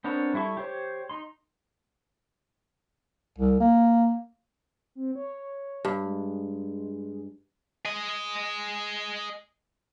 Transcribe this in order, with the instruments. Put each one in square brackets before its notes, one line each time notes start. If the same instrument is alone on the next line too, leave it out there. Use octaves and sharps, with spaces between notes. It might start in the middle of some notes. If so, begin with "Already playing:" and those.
[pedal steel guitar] B3 C4 D4 A#4 C#5
G3 E4 A4 C#6
G4 C5 C#5
D#4 C6
[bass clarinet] C2
A#3
[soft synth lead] C4
C#5
[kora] G2
[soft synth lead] G#3
[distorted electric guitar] G#4 D#5